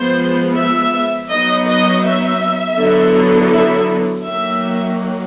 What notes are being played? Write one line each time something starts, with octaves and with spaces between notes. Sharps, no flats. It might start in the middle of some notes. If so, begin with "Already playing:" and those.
Already playing: F3 G#3 B3 C5
E5
F#3 B3 D#4 D#5
D#5
E5
D3 F#3 B3 E4
E5
D#3 F#3 A#3 E5